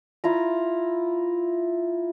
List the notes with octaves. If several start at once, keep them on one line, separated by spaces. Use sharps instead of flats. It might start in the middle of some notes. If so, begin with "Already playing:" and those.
E4 F4 A#5